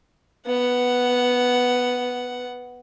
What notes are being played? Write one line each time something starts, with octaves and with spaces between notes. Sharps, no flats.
B3 F#5